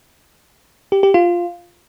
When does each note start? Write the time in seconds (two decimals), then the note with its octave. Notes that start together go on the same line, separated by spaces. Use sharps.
0.92 G4
1.03 G4
1.14 F4